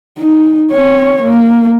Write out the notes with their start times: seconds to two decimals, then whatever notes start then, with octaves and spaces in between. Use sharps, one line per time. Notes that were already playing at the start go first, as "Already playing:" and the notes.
0.18 D#4
0.72 C4 C#5
1.22 A#3